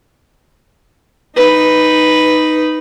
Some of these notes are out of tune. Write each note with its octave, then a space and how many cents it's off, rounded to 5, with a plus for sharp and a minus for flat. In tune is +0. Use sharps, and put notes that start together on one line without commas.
D#4 +0 B4 +0